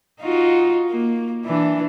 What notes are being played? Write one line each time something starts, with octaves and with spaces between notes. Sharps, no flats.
D#4 F4 F#4
A#3
E3 D4